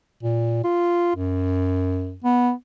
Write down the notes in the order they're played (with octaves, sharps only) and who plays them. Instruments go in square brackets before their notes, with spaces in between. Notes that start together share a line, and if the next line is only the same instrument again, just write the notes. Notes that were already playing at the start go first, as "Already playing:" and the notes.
[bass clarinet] A#2
F4
F#2
B3